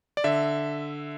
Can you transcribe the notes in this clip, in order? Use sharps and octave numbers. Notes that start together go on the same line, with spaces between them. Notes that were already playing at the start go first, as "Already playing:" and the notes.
D5
D3 E5